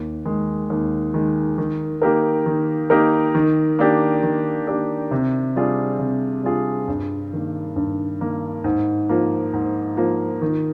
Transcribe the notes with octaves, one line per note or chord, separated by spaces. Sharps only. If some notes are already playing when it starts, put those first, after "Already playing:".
Already playing: D#2
D#3 G#3
D#2
D#3 G#3
D#3
A#3 D#4 G4 A#4
D#3
A#3 D#4 G4 A#4
D#3
A#3 D4 G4
D#3
A#3 D4 G4
C3
G3 D4 F4 G#4
C3
G3 D4 F4 G#4
G2
D#3 A#3
G2
D#3 A#3
G#2
F3 A#3
G#2
F3 A#3
D#3